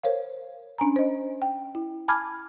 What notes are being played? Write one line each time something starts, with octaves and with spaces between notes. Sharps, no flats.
A#4 C5 C#5 F5
C#4 D4 G#5 A#5
C5 D#5
G5
E4
G#5 A5 B5 D6 F6 G#6